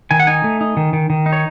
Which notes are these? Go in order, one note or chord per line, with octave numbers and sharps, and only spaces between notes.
D#3 G#5
F#5
D#4 G#5
A3
D#4
D#3
D#3
D#3
D#4
C#5